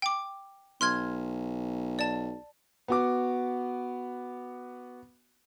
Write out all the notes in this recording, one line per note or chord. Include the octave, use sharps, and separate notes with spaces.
G5 D6
B1 C6 F6 G#6
D5 A5
B3 F#4 D6